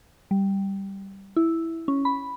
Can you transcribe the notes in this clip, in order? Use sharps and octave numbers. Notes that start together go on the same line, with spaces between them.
G3
E4
C#4
B5